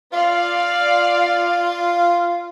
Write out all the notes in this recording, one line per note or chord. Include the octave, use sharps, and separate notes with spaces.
F4 D5 F5